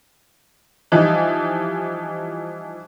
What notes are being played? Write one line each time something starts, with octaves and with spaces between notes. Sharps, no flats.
E3 F3 G3 D#4